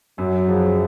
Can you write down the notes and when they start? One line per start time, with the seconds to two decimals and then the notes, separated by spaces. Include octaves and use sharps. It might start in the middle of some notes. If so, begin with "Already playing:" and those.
0.18 F#2 F#3
0.47 C#3 F3